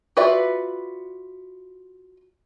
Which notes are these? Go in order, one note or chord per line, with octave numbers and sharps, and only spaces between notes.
F4 F#4 B4 D5 E5